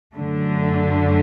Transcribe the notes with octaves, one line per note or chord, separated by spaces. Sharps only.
F#2 D3 A3